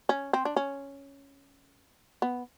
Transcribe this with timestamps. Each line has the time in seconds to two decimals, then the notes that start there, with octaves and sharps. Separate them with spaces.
0.09 C#4
0.33 C4
0.45 D4
0.56 C#4
2.22 B3